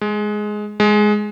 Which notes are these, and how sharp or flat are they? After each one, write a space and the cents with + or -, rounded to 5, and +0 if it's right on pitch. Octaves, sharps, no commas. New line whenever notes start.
G#3 +10
G#3 +10